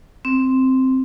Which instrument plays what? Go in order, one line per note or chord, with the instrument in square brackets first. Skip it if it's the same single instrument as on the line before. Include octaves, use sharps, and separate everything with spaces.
[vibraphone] C4